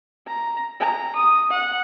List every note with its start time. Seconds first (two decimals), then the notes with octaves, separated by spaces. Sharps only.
0.27 A#5
0.80 A#5
1.16 D#6
1.51 F#5